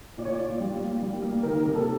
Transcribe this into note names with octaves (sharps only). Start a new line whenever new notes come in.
A#2 D5
C#5
D5
A#2
G3
A#3
G3
A#3
D#3 A#4
C3
A4